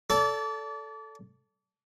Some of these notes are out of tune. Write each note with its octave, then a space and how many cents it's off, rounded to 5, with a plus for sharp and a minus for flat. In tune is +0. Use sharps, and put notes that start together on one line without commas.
A4 +0 D5 -30